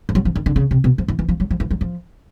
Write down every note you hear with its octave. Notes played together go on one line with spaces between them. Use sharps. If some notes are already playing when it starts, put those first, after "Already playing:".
F3
F#3
F3
D#3
D3
C#3
C3
B2
F3
E3
E3
F3
F#3
F3
E3
F#3
F3